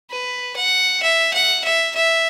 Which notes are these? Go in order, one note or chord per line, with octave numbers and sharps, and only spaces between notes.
B4
F#5
E5
F#5
E5
E5